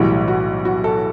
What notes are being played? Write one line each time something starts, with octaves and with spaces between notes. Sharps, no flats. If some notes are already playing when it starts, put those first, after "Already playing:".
Already playing: B1 A2 E3 G3 F#4
F#4
F#4
A4